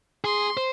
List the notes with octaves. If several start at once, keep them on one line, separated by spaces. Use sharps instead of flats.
G#4 C6
C5